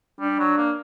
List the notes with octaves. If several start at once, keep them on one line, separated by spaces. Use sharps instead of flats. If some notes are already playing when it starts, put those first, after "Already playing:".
G3 D4
F#3
A#3